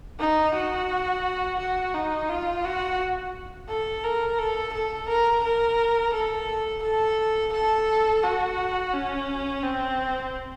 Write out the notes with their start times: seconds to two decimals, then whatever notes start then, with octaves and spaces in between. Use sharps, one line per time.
0.19 D#4
0.54 F#4
1.59 F#4
1.94 D#4
2.29 F4
2.64 F#4
3.69 A4
4.04 A#4
4.39 A4
4.73 A4
5.09 A#4
5.44 A#4
6.13 A4
6.83 A4
7.53 A4
8.23 F#4
8.92 C#4
9.63 C4